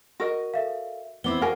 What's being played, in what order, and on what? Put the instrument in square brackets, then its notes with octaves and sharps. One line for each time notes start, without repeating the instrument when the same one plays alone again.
[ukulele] F#4 A#4 D#5
[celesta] A4 E5 F5
[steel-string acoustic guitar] B3 C4 E4 [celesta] D6 G7
[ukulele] F#4 A#4 G#5 [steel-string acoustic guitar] F5 [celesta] F#5